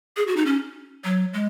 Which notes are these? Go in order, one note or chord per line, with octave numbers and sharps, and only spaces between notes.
G#4
F#4
D#4
C#4
F#3
G#3